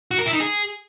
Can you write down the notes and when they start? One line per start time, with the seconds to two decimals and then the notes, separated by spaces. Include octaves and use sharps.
0.11 F#4
0.18 A#4
0.26 E4
0.33 D#4
0.40 G#4